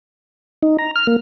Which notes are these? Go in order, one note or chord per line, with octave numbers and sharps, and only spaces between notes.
D#4
A#5
F6
A#3